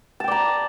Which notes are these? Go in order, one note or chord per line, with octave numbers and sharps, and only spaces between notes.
D5 G5 A5 A#5